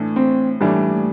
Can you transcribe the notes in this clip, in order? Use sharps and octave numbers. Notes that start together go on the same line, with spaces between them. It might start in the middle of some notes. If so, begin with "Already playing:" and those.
Already playing: A2 E3 A3 D4
C4
A2 E3 G3 A3 D4